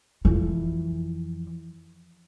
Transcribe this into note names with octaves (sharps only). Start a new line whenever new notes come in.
F2 E3